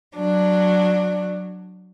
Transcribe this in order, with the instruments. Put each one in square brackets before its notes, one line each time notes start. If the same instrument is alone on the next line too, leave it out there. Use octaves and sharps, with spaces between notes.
[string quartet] F#3 D4